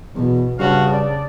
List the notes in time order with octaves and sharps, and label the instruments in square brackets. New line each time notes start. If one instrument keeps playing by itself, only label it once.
[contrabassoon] E2 [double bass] B2
[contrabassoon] G2 [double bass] C#3 D4 [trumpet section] F#4 F5 F#5
[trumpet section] D5